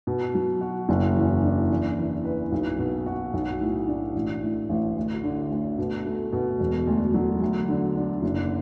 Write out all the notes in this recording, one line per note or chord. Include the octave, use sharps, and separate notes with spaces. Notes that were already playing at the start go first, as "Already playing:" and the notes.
B2
F#3
F#4
F#1
E2
D4
E2
E3
B4
B1
B2
F#4
B1
A2
D4
A1
A2
A1
D2
D3
D2
B2
A3
B2
E1
D2
F#3
D2
D3
D4
F#1